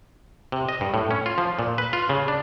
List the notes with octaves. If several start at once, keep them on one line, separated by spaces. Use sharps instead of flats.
C3
D#5
G2
A2
C#4
F4
F3
A#2
B4
F4
C#3
D4